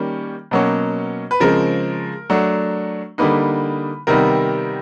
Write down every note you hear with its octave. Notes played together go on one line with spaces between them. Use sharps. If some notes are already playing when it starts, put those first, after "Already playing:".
Already playing: D#3 G3 A#3 C#4
B2 F#3 A#3 C#4
B4
C#3 F3 G#3 C4 A#4
F#3 A3 D4
D3 G3 A#3 D#4 B4
C3 D#3 G3 B3 A#4